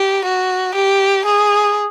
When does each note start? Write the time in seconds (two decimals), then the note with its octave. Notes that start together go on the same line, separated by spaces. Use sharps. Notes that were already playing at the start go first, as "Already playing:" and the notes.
Already playing: G4
0.25 F#4
0.75 G4
1.25 G#4